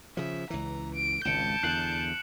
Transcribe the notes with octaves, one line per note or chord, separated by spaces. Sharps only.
C#3 F3 E5
C#2 E3 A#5
D7
G#1 C#2 A5 G6 C#7 D7 E7
E2 D3 F#6 C7 F#7